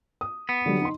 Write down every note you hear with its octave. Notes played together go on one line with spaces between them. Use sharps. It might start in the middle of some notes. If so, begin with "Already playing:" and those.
D#6
B3
D3 F#3 G3
D#4 C6